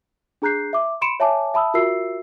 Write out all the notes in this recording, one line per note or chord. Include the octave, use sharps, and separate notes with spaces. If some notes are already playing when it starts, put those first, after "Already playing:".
D4 G#4 A#5 F#6 G6 C7
E5 D6
B5 C6 C#7 D7 E7
C#5 E5 G#5 A5 D6
E5 A5 B5 D#6 E6
F4 F#4 A#4 E5 E6 C7